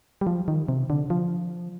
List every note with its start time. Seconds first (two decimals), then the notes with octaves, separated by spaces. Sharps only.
0.21 G3
0.27 F3
0.48 D#3
0.69 C3
0.90 D3
1.10 F3